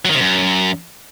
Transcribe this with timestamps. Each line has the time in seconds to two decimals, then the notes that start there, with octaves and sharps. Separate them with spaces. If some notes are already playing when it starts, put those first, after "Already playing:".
0.05 F#3
0.10 D#3
0.15 C3
0.20 F#2